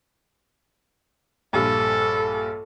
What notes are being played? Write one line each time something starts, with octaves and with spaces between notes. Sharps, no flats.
A#1 G2 A4